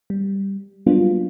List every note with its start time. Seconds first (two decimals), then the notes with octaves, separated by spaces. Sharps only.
0.10 G3
0.86 F#3 G3 A#3 B3 D4 F4